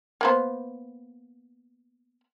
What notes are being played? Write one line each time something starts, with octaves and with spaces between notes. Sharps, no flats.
A#3 B3 C5